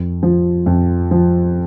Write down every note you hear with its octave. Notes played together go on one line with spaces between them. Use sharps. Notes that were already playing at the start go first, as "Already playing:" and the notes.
Already playing: F2
F3
F2
F3